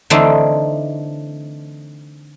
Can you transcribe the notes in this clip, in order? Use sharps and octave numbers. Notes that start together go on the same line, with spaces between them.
D3 E3 A3 C4 D4 D#4